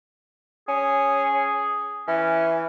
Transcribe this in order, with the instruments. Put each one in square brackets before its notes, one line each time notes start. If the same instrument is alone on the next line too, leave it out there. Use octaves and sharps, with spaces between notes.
[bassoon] C#4 [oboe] G#4
[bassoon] E3 [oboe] C#4